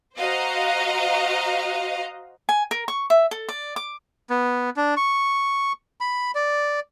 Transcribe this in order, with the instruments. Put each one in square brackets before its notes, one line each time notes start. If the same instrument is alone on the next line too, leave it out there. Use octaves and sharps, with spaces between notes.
[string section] F#4 C5 D#5 F5 A#5
[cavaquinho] G#5
A#4
C#6
E5
A4
D5
D6
[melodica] B3
D4
C#6
B5
D5